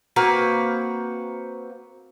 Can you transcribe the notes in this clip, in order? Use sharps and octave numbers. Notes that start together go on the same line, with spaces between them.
A#3 C4 F#4 B4